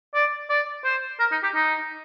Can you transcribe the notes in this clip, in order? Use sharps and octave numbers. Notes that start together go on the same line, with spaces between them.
D5
D5
C5
A#4
D#4
G4
D#4